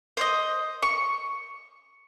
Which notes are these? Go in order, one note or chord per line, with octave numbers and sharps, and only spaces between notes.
C5 C#5 D#5
C#6